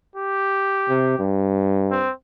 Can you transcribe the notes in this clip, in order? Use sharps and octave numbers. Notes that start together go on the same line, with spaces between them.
G4
C3
G2
C4